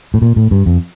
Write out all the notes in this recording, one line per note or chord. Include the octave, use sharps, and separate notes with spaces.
A2
A#2
A2
G2
F2